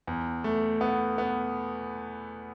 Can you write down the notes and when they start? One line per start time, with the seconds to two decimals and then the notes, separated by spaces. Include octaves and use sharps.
0.07 E2
0.44 A3
0.81 B3
1.18 B3